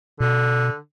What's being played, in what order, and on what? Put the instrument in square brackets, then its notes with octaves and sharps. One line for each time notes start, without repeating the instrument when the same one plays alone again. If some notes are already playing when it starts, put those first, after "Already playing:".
[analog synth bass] B2 [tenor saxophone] D3